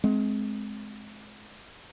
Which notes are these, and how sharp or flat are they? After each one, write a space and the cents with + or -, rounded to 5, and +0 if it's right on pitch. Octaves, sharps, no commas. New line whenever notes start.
G#3 +25 C4 +0